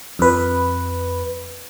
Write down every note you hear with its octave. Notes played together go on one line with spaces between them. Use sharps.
F2 B4